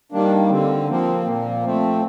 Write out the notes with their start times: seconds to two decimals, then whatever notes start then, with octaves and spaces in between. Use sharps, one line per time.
0.12 D#3 G3 A#3 D4
0.50 D3 C4
0.89 F3 A#3 C4
1.26 A#2 A#3
1.63 F3 A3 C4